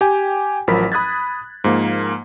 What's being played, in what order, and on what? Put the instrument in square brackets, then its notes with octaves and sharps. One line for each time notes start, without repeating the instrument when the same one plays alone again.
[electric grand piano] G4 G5 G#5
A1 F3 F#3 A#4 B5 B6
B5 D#6 F#6 G#6 A6
G#2 F3 A#3